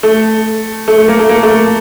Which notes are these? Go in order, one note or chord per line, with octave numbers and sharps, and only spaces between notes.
A3
A3
A3
A#3
A3
A#3
A3